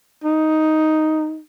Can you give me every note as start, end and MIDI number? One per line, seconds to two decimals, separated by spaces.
0.24 1.39 63